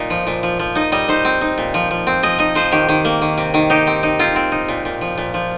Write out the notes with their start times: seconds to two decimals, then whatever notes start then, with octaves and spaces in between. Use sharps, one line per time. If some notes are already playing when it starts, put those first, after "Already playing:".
Already playing: A#2 D#4
0.10 F3
0.27 A#2
0.43 F3
0.59 F3
0.75 D#4 D#5
0.92 G3 D#5
1.08 D#4 C5
1.25 C4
1.41 D#4
1.58 A#2
1.74 F3
1.91 F3
2.07 C4
2.23 F3 D#5
2.39 D#4 D#5
2.55 F3 C5
2.72 D#3 G4
2.89 D#3
3.05 A#3
3.21 D#3
3.38 C3
3.54 D#3
3.70 D#4 G4
3.87 C4
4.03 D#4
4.19 C4 F4
4.36 C4
4.52 D#4
4.68 A#2
4.85 A#2
5.01 F3
5.18 A#2
5.34 F3